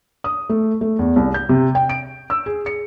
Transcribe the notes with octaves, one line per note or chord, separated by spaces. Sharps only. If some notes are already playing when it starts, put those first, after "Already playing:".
D#6
A3
A3
E2
C2
G6
C3
G5
D7
E6
G#4
C#7